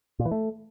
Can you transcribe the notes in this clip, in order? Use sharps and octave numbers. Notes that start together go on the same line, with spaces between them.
A#2
E3
A3